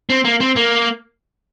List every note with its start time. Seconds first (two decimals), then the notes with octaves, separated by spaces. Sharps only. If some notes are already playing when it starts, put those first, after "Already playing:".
0.10 C4
0.24 A#3
0.40 C4
0.56 A#3